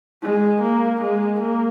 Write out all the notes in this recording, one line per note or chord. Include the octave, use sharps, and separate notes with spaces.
G#3
A#3
G#3
A#3